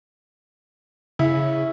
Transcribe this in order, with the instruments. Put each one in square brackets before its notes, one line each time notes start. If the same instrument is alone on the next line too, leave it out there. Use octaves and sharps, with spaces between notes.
[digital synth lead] C#3 [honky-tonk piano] E4